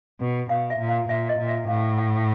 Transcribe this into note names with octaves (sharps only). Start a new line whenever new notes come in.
B2
B2 F5
E5
A#2
F5
A#2 E5
D#5
A#2
E5
A2 F5
F#5